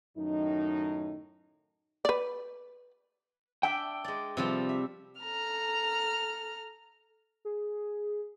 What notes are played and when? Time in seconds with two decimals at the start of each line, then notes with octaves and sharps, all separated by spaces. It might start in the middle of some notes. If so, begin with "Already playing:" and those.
0.17 F#2 A2 D#3 D#4
2.05 B4 D5
3.63 D4 E5 G5
4.04 G#3 D5
4.37 C3 F3 G3
4.69 E5
5.21 A4 A#5 F6
7.45 G#4